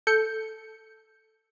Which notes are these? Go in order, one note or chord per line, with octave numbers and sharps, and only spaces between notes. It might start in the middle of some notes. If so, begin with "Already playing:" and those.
A4 G6 C#7